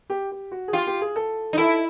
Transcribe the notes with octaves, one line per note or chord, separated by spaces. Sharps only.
G4
G4
F#4
G#4
F4 G4
G4
G#4
A4
D#4
E4 A4